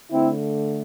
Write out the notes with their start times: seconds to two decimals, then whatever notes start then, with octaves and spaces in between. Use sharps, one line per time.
0.12 D3 A3 C4 E4